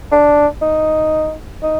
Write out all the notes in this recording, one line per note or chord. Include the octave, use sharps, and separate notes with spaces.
D4
D#4
D#4